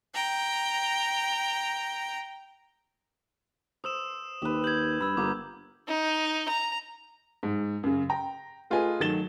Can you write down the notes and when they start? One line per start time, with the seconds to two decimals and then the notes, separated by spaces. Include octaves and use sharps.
0.14 G5 A#5
3.84 C5 D#6 E6 E7
4.42 D#2 G4 B4
4.64 G6 G#6 F#7
5.01 G2 B5 E6
5.17 G1 A#3 B3 D6
5.88 D#4
6.48 A#5
7.43 G#2
7.83 F#2 C#3
8.10 G5 A#5
8.70 A3 F4 G#4 B4 D#5 G#5
9.00 D#3 F#3 A3 A6 E7 G7